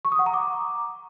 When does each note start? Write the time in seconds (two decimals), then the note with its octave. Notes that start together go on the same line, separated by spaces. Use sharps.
0.05 C#6
0.12 D#6
0.19 F#5
0.26 A#5
0.34 D6